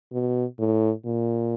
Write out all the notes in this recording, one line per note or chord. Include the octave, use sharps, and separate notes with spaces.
B2
A2
A#2